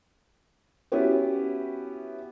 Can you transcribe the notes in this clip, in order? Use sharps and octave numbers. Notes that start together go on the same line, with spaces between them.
B3 C#4 E4 F#4 G4 B4